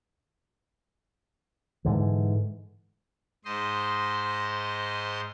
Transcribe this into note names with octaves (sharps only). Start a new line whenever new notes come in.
G#2 D3 E3
G#2 C5 D#5 C6